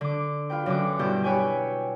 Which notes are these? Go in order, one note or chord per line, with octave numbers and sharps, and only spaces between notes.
D3 D6
F4 B4 G5
F#2 D3 D6
G2 B2 E4 G4 G6
G4 B4 C#5 G5 G#5